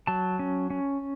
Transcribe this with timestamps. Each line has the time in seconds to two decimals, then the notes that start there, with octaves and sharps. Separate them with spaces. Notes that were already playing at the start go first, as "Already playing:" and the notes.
0.07 F#3 A5
0.39 C#4
0.70 C#4